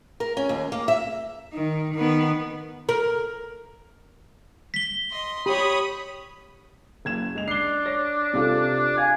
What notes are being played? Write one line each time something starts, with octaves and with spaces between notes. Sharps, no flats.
A#4
C#4
D#2
A#3
E5
D#3
D#3 B3
A#4
B6 G7
D#5 C6
G4 C#5 B5 D#6
F#1 G#6 E7
G#3 F7
D4 C7 G7
C#5 A#6
C3 F4 A4
F5 G#5